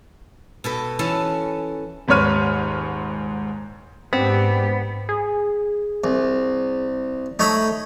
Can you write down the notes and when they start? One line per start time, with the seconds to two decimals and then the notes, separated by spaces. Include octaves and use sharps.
0.64 B2 A4 B4
0.99 E3 C#4 E4 A4 A5
2.08 D#1 G#2 B4 C#5 F6 D#7
4.13 G#2 B3 C4 D4 G4
5.09 G#4
6.04 C2
7.39 A3 D#4 C#5 B5